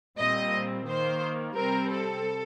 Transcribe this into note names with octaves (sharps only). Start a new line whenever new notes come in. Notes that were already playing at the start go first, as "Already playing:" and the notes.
A#2 G3 C4 D#5
D#3 A#3 C5
C3 G3 C4 A#4
A4